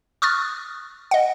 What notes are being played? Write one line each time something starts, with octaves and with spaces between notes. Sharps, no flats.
C#6 D#6 F6 F#6 A6
D#5 F#5